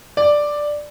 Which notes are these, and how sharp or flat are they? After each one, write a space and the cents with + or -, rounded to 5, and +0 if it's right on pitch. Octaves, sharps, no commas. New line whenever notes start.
D5 +5